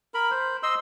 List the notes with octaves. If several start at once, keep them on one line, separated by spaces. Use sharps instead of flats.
A#4 B5
C5
D#5 C6 E6